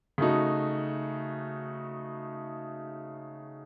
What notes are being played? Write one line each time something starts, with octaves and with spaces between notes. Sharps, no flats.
C#3 A3 D#4 F#4